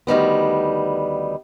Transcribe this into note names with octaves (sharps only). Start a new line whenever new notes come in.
D2 D#3 G3 B3